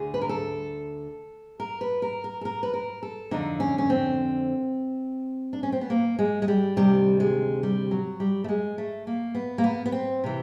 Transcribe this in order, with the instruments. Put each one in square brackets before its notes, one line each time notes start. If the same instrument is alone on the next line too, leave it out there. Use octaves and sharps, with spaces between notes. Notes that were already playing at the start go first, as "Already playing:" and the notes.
Already playing: [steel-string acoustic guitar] D2 D3 G#4
B4
A#4
A4
A#4
B4
A#4
A#4
A4
A#4
B4
A#4
A4
F2 D3 D#4
C#4
C#4
C4
D4
C#4
C4
B3
A#3
G#3
G#3
G3
D2 C3 D#3 G3
G#3
G3
F#3
G3
A3
G#3
A3
A#3
B3
A#3
B3
B3
C4
C3 E3